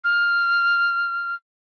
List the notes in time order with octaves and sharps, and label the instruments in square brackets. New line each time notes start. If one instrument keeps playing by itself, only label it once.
[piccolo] F6